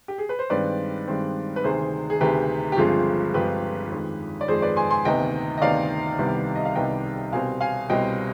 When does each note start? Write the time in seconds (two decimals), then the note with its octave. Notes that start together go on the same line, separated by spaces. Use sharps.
0.08 G4
0.18 G#4
0.29 B4
0.39 C5
0.50 G2 D#3 G#3 C4 B4 D5
1.07 G2 D#3 G#3 C4
1.56 B4
1.64 D2 C3 D#3 G#4 C5
2.10 G#4
2.21 D2 C3 D#3 G4 B4
2.72 G4
2.77 G1 G2 F3 G#3 C4 F4 G#4
3.34 G1 G2 F3 G#3 C4 G4 B4
3.91 F2 D#3 G#3
4.41 D5
4.48 F2 D#3 G#3 G#4 C5
4.62 B4 D5
4.76 G#5 C6
4.91 G#5 C6
5.05 D2 C3 D#3 B3 D#5 G5
5.58 D#5
5.61 D2 C3 D#3 B3 D5 F5
6.19 C2 C3 D#3 G3 B3
6.55 D#5
6.65 F5
6.75 C2 C3 D#3 G3 B3 D#5 G5
7.32 C2 B2 G3 C4 F5 G#5
7.61 F5 G#5
7.89 C2 B2 G3 C4 D#5 G5